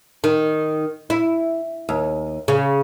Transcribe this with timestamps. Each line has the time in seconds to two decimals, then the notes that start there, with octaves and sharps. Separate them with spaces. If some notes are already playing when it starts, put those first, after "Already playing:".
0.24 D#3
1.10 E4
1.89 D#2
2.48 C#3